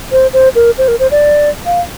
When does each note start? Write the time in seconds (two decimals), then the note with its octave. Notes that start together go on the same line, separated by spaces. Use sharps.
0.12 C5
0.33 C5
0.55 A#4
0.78 C5
0.88 A#4
0.99 C5
1.11 D5
1.66 F5